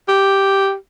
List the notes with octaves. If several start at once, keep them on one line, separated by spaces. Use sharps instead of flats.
G4